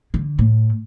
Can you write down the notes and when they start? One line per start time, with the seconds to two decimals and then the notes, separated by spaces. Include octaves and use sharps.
0.14 D3
0.39 A2